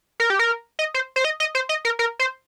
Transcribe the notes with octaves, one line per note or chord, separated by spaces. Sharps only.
A#4
G4
A#4
D#5
C5
C5
D#5
D#5
C5
D#5
A#4
A#4
C5